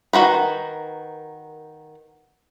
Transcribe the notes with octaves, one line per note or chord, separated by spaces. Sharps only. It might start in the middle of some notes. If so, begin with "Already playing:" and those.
D#3 F#4 A#4 B4